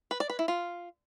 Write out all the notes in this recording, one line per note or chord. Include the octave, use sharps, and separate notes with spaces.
B4
D5
B4
E4
F4